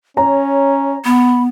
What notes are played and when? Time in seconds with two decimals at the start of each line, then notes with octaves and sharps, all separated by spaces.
0.17 C#4 C#5 A#5
1.05 B3 B5